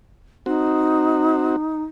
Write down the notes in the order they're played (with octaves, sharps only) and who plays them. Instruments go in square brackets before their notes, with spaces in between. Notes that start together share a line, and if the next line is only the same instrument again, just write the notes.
[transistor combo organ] C4 F#4 [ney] D#4